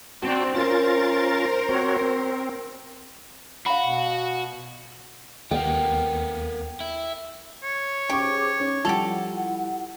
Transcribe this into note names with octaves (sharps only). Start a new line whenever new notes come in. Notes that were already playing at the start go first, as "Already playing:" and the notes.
C4 D4 F#4 G5 A5
C#4 F4 A#4 C5 A6
C4 F#4 C#5
C4
F#4 F5 B5
B2
D#2 A#3 B3 G5
E4
C#5
C#4 G4 G#4 C5 C#6 D6
C#4 D#4
F3 G3 E4 G4 A4 F#5 F7